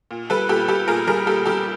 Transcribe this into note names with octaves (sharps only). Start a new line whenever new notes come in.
A#2
G3 A4 B4
A#2 G4 A4
G3 G4 A4
A#2 G#4 A#4
G3 G#4 A#4
A#2 G4 A4
G3 G4 A4